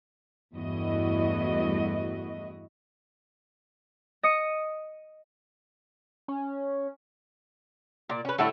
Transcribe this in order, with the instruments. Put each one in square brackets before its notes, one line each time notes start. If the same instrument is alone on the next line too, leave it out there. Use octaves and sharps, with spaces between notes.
[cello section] E2 G2 A3 E4 F#4 D#5
[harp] D#5 D#6 C#7
[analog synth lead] C#4
[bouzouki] A#2 D5
C#4 B4
[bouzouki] A2 D3 A4 [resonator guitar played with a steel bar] G3 A3 E4